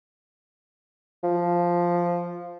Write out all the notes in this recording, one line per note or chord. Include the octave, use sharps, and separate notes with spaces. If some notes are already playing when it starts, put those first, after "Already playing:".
F3